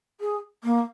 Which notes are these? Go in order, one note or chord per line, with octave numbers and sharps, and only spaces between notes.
G#4
A#3